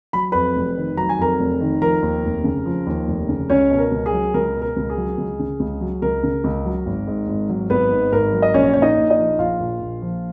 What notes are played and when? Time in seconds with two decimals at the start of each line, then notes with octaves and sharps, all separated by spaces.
0.13 F#3 B5
0.32 F2 B4 B5
0.56 F1
0.77 D#3
0.97 F#3 A#5
1.09 G#5
1.18 F2 A#4 A#5
1.39 F1
1.61 D#3
1.81 F3 A#4 A#5
2.02 D#2
2.24 F1
2.44 C#3
2.66 F3
2.86 D#2
3.08 F1
3.29 C#3
3.50 C#2 C#4 C#5
3.71 B2
3.78 A#4
3.92 C#2
4.06 G#4
4.13 F#3
4.34 C#2 A#4
4.55 B2
4.62 A#4
4.76 C#2
4.90 G#4
4.97 F#3
5.18 C#2
5.39 C#3
5.60 C#2
5.81 F#3
6.02 C#2 A#4
6.23 C#3
6.44 C#2
6.65 F#3
6.86 G#1
7.07 G#2
7.28 G#1
7.49 F#3
7.70 G#1 B3 B4
7.92 G#2
8.12 G#1 A#4
8.33 F#3
8.42 D#5
8.54 A#1 C#4 C#5
8.74 A#2 C#5
8.82 D#4 D#5
8.96 A#1
9.10 D#4 D#5
9.17 F3
9.38 A#1 F4 F5
9.60 A#2
9.80 A#1
10.02 F3